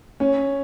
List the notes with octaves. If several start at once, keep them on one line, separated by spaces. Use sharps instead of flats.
C#4